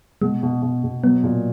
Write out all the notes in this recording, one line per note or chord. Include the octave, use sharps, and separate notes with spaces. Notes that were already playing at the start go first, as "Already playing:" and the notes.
B2 G#3
B2
B2
B2
F#3 B3
A#2